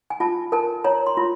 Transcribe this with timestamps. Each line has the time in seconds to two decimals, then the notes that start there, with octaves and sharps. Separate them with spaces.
0.10 G#5
0.20 F4 A5
0.52 A#4 A5
0.84 C#5 A#5
1.07 C6
1.17 F4